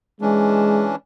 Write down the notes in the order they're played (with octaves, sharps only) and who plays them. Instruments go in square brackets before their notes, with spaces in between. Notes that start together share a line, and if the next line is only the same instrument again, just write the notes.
[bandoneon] E3 C#4 D4 [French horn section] G#3